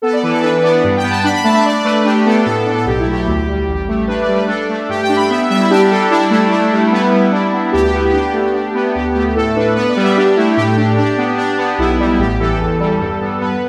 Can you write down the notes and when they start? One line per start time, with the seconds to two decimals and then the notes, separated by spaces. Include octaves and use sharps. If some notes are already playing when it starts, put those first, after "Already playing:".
0.02 B3 A4
0.13 D5
0.23 E3 B4
0.33 A4
0.43 D4 B4
0.63 B3 D5
0.84 G2
0.97 G5
1.03 B3
1.10 A5
1.23 D4 B5
1.34 B5
1.44 A3 A5
1.54 E5
1.64 D4 D5
1.84 A3 B4
2.04 D4 G4
2.25 B3 A4
2.46 A2 A4
2.66 D4
2.75 A4
2.86 B1 G4
2.99 E4
3.07 A3
3.13 G4
3.27 D2
3.48 G3
3.67 A1
3.88 A3
4.07 D4 B4
4.21 D5
4.28 G3
4.35 B4
4.48 D4 A4
4.69 A3
4.89 G2 G4
5.03 G5
5.09 D4
5.16 B5
5.29 B3 E5
5.50 G3 E5
5.60 E4
5.70 D4 G4
5.91 G3 A4
6.11 D4 E4
6.31 A3
6.51 D4
6.72 G3
6.92 B3
7.12 G3
7.32 D4
7.53 B3
7.72 D2 G4
7.94 B3 E4
8.13 D4 G4
8.33 A3
8.54 D4
8.74 B3
8.94 D2 G4
9.15 A3 G4
9.35 A2 A4
9.56 D4 B4
9.76 B3 B4
9.89 D5
9.96 G3
10.03 E5
10.16 D4 G4
10.36 A3 E4
10.57 A2 G4
10.77 D4
10.98 D4
11.17 B3
11.38 D4
11.58 B3
11.78 B1 E4
11.99 G3
12.19 A1 G4
12.40 E3 A4
12.60 E2
12.80 G3
13.01 G2
13.20 B3
13.41 B3 B4